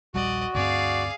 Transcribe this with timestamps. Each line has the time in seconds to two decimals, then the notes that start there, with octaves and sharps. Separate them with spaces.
0.14 D#1 A#1 G3 F#4 D5 D#5
0.55 D2 G2 C4 G#4 D5 F5